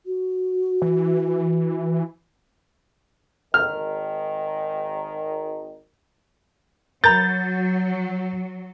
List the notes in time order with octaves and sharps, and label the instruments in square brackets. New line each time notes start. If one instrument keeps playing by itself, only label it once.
[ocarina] F#4
[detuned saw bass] E3
[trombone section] G#1 D#3 [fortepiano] F6
[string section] F#3 [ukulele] A#4 A#5 B5 [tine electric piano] G6 [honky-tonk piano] A6